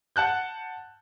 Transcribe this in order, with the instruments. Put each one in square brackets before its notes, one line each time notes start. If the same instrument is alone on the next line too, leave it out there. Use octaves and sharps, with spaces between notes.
[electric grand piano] F#5 A5 F#6 G6